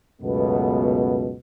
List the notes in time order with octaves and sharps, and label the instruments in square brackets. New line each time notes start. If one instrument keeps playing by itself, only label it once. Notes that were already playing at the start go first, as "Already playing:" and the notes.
[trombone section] C#2 F#2 B2 A3 B3